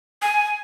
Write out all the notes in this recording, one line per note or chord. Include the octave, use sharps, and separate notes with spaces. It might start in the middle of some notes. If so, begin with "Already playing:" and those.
G#5